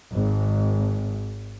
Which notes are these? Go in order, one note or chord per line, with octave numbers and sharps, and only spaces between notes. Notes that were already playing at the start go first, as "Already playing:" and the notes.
G#1